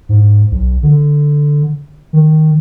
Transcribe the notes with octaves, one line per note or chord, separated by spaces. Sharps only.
G#2
B1
D3
D#3